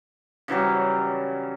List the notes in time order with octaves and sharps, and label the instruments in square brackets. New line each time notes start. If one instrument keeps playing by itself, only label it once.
[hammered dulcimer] C#3 E3 F#3 G3